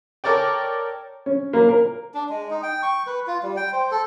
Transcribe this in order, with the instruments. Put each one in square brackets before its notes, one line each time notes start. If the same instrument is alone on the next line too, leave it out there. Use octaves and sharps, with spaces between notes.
[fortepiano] A4 A#4 C#5 D5 G5
C#4
A#3
A#4
[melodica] D4
G#3
D#4
G5
C#6
B4
F4
G3
G5
C5
A4